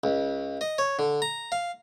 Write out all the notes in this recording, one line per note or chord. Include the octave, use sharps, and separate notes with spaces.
C#2
D#5
C#5
D3
A#5
F5